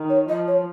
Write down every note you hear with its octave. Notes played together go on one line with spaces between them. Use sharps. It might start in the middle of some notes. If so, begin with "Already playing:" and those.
Already playing: D#3
C#5
F3 D#5
C#5